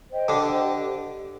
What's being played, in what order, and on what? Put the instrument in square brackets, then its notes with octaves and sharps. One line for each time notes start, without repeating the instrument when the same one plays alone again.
[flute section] C5 D#5 G5
[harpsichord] D3 D4 [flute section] G4
[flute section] C5 D#5 G5
G4